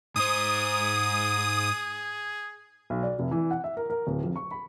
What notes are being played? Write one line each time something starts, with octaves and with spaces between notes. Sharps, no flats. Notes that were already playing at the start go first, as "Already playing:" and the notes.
G#2 G#4 C5 D#6
B1
D5
F1
E3
F#5
E5
A#4
A#4
D1
F2
C#6
B5